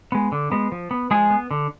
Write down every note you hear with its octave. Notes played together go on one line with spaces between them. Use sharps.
G#3 B3
D3
G#3 B3
F3
B3
F3 G#3 G#4
B3
D3